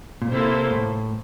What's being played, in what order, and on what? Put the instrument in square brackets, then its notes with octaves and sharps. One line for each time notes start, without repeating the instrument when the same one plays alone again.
[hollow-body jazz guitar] A#2
[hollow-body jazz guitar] C3 [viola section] A#3 E4 A4 C5
[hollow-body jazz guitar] A2